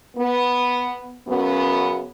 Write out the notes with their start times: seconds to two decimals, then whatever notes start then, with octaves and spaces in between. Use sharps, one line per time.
0.17 B3
1.27 F#2 C#3 B3